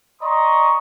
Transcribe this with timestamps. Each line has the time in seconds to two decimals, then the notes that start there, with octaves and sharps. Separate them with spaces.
0.22 D5 D#5 A#5 C6 C#6 D#6